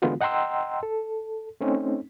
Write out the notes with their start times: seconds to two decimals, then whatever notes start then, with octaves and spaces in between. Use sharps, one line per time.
0.02 D3 E3 G#3 B3 F4 F#4
0.21 D#5 F#5 G5 A#5 C6 E6
0.83 A4
1.61 A3 C4 C#4 D#4